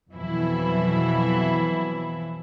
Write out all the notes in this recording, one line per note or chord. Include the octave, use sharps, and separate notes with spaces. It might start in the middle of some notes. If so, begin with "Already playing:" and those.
F2 B2 E3 F#3 E4